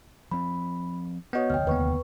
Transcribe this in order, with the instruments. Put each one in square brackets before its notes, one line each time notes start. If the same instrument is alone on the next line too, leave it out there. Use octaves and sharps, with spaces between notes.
[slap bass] F3 C4 [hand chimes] B5
[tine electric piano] B3 F#4 [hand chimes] C#5 D#5 G6
[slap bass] F1 D2 [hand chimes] G5 F6
[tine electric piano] D#2 B3 [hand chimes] B4 C#6